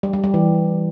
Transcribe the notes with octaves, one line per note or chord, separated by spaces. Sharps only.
G3
G3
G3
E3